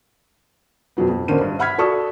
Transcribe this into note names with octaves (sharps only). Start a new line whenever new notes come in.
F2 B2 F#3 B3
F2
A1 D3 C#4 A#4 C5 D#7
G2
E5 F#5 B5 F6 G#6 B6
F#4 A4 D5 C#6 D#6